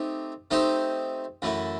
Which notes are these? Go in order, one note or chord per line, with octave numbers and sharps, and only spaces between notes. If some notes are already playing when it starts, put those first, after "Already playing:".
Already playing: A3 C4 D#4 G4
A3 C4 D#4 G4 C5
F#2 E3 A3 E4